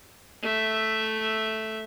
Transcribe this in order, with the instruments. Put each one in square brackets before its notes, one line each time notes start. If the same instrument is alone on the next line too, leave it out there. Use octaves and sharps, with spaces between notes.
[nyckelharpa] A3 E5